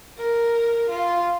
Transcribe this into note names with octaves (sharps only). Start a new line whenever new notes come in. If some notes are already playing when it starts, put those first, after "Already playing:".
A#4
F4